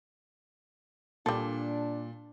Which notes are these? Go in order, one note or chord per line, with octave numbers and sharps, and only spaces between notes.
A#2 G3 D4 A4